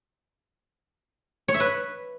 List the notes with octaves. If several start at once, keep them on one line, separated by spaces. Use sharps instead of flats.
C#5
E5
B4